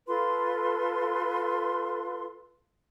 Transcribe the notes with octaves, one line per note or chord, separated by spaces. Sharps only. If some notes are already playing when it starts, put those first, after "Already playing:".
F4 A4 B4 C6